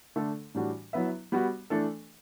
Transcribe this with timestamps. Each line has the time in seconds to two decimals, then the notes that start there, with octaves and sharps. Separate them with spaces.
0.16 D3 A3 D4 A4
0.55 A2 E3 G3 D4 F#4
0.93 F#3 B3 E4 B4 E5
1.32 G3 B3 F#4
1.70 E3 A3 D4 A4